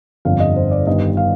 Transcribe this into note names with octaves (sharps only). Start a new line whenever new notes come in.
G1 F2 D3 F5
D#5
C5
D5
G1 G2 D#3 D#5
F5